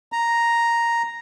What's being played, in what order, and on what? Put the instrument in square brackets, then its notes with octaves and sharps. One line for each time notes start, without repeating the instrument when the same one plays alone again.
[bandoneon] A#5